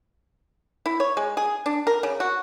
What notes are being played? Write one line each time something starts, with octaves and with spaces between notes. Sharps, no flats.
E4
C#5
G#3
G#4
D4
A#4
C#3
F#4